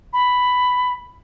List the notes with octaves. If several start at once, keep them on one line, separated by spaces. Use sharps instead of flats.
B5